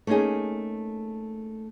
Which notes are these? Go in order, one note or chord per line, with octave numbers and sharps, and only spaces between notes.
A3 A#3 C#4 D#4 G#4